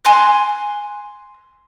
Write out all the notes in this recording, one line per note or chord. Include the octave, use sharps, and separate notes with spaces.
G#5 C6 F#6